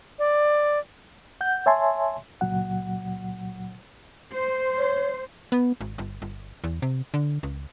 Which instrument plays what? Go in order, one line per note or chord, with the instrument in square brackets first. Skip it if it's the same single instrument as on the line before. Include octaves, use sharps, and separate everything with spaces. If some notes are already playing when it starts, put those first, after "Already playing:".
[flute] D5
[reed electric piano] F#5 G6
C#5 E5 G#5 A5 C6
C#2 A#2 F#3 F#5
[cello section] C5
[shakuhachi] C#5
[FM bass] B3
G#1
G1
G1
E2
C3
D3
C#2